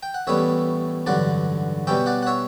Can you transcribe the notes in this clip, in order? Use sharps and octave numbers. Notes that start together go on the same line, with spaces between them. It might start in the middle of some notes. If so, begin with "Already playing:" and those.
G5
F#5
A1 A2 G3 B3 C#5 E5
A1 G2 D3 F#3 D5 F#5
B2 G3 C#4 E5 G5
D5 F#5
F#5
C#5 E5